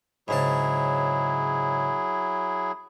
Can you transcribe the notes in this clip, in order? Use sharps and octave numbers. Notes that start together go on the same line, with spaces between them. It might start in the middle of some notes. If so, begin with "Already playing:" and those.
G#2 C#3 F#3 E4 G#4 A5